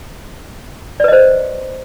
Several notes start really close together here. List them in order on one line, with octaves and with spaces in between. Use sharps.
D5 B4 D#5 C5